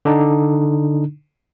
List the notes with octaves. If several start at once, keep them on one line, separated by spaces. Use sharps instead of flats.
D3 D4 D#4